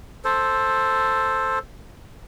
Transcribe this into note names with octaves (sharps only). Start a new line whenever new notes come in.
A4 C5